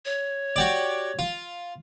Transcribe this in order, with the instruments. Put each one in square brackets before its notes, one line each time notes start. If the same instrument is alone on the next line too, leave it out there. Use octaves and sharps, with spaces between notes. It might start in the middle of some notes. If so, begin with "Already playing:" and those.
[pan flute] C#5
[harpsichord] F#4 G4 D5
F4